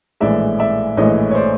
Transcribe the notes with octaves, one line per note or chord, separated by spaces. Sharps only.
A#1 A2 E3 G#3 D5 E5
D5 E5
A#1 A2 E3 G#3 C#5 D#5
C#5
C5 D5